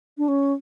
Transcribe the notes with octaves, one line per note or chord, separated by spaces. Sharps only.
D4
C#4